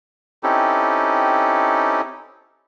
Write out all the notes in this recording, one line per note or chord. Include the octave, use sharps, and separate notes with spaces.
C4 C#4 D#4 E4 G4 A4